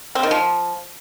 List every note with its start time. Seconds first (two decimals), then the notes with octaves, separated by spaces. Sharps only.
0.15 C4
0.23 D#3
0.31 F3